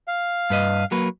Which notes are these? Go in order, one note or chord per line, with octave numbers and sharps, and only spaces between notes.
F5
G2 B4 D#5
F#3 A#3 B4